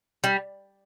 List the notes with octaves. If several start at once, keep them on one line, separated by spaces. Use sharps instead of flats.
G3